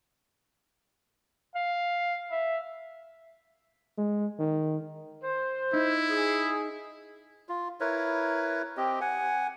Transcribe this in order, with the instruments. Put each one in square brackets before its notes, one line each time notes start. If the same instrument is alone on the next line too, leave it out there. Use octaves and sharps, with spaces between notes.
[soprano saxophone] F5
E5
[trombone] G#3
D#3
[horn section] C5
[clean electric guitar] D#4 [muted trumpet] E4
[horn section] G#4
[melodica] F4
E4 A#4 B4 C#5
C4 G4 D#5
F#5 G#5